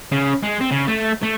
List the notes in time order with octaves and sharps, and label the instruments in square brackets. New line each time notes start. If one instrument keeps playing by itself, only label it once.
[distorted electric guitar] C#3
G#3
C4
C#3
A3
A3